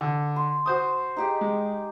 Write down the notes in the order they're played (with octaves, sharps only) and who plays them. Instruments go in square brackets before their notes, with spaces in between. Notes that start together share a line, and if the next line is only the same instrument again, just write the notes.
[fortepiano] D3
[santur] C6
[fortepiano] F#4 C5 D#6
[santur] D#4 G4 G#4
[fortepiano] G#3